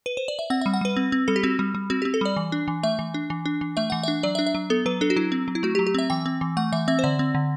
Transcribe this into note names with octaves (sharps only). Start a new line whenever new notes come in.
B4
C5
D5
E5
C4 F#5
E5
G3
F#5
G3 B4
C4
C4
G3 A4
G4
C4 F#4
G3
G3
C4 F#4
G4
C4
A4
G3 D5
E3
D4
E3
A3 E5
E3
D4
E3
D4
E3
A3 E5
E3 F#5
E5
D4
F#3 D5
E5
D4
E5
F#3
B3 A4
F#3 B4
D4 A4
F#4
F#3 E4
C4
F#3
E4
A3 F#4
G4
F#3
G4
C4 E5
E3 G5
C4
E3
A3 F#5
E3 E5
C4 E5
C5
D3 D5
C4
D3